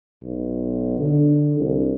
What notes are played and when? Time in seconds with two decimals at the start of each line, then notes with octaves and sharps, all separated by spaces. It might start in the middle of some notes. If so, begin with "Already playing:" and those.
0.23 B1
1.00 D3
1.60 C2